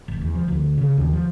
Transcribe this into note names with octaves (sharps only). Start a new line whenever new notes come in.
F1
E2
F3
D2
C#3
D#2
F3